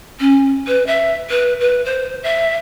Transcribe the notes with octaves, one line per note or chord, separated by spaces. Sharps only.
C#4
B4
E5
B4
B4
C5
E5